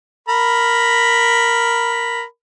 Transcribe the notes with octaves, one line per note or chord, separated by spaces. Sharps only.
A#4 B5